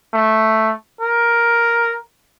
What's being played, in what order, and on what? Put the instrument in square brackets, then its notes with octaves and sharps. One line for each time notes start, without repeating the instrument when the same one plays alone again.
[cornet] A3
A#4